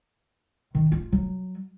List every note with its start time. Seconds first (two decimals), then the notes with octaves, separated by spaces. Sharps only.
0.75 D#3
0.92 F4
1.12 F#3